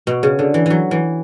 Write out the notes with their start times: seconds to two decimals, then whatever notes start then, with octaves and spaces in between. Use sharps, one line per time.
0.07 B2
0.23 C#3
0.39 D3
0.54 E3
0.66 E3 F#3
0.91 E3